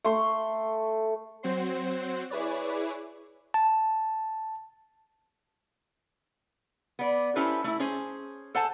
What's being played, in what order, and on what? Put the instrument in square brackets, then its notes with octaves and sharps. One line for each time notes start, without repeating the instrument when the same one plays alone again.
[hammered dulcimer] A3 C6
[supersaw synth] F#3 C4 F#4 C5 C7
E4 G#4 B4 C#5 D5
[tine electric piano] A5
[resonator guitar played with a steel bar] B3 D5
C#4 E4 G4 A4 B4 C5
A3 E4
C#4 G#4 C5
A4 C5 F#5 G#5 A5